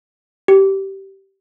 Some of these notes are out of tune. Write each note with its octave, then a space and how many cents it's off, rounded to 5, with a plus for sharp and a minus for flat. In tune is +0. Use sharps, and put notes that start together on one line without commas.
G4 -15